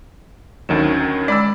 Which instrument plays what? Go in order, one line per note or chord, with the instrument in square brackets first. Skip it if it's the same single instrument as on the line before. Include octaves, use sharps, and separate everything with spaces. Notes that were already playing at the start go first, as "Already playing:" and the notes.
[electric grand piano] D2 D#3 F#3 [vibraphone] C#4
[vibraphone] G#3 [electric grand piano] D5 B5 E6